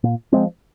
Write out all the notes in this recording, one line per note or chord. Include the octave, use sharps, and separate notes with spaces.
A#2
F3 G#3 C4